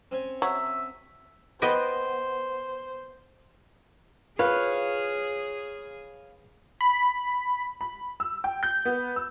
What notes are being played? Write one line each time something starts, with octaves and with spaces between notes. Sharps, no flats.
C4 C#4 G#5
F#3 E5
B3 C5 D#5 G5
F4 G#4 B4 C#5 F5
B5
B5
E6
G5
G6
B3
E6